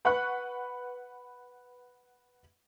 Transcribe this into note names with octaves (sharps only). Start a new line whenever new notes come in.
B4 F#5 B5 C#6 F#6